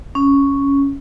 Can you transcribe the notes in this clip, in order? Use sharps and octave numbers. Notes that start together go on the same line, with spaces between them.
C#4